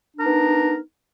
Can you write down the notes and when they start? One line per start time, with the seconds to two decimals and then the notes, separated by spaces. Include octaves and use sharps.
0.16 D4
0.19 A#4
0.23 D#4
0.26 B3